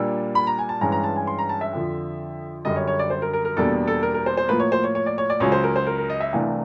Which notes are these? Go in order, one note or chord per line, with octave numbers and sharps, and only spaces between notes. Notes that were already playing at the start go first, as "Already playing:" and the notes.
Already playing: A#2 G3 A#3 D4 E6
B5
A#5
G#5
A5
G2 E3 G#3 C#4 A#5
A#5
A5
G#5
C6
A#5
A5
E5
F2 D3 F3
F#2 D3 G3 D#5
C#5
C#5
D5
C5
A#4
A#4
A#4
E2 B2 G3 A#3 D4 A4
A4
A#4
A#4
C5
C5
A2 F3 A#3 B4
C#5
C5
C#5
C#5
D5
C#5
D5
C#2 C#3 F#3 C#5
C5
A#4
C5
A#4
A#4
D#5
E5
C2 C3 E3 A3 D4 F5